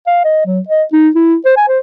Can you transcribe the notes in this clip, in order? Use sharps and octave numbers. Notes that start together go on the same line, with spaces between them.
F5
D#5
F#3
D#5
D#4
E4
C5
G#5
C5